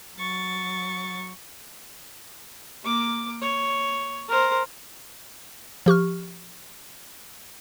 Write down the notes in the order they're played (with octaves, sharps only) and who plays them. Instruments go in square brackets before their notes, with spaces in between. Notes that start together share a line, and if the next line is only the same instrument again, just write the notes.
[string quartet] F#3 C#6 A6
[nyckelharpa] A#3 D6
C#5
A#4 C5
[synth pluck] F3 G4 C#6 F6